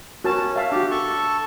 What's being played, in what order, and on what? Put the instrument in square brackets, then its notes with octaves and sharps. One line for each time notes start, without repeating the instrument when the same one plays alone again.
[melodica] C#4 [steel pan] F#4 A#4 A5
[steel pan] E5 F5 A5
[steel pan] D4 F#4 [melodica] G4
[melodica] A4 A5 C#6